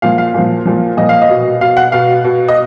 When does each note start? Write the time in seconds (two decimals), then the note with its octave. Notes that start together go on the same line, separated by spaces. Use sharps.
0.02 A#2 F3 F5
0.18 F5
0.34 A#2 F3
0.66 A#2 F3
0.97 A#2 F3 D#5
1.09 F5
1.22 D#5
1.29 B2
1.61 B2 F5
1.77 F#5
1.92 B2 F5
2.24 B2
2.48 D#5